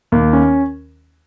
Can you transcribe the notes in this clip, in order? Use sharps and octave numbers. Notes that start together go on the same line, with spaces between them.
D#2
C#4